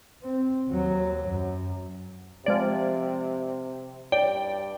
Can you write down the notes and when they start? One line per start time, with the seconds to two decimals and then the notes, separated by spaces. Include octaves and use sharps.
0.22 C4
0.69 D#2 F#3
1.27 F#2
2.46 C3 F3 G#3 D5
4.12 G2 D5 G5